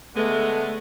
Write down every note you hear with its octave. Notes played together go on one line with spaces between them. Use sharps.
D3 G#3 A3 B3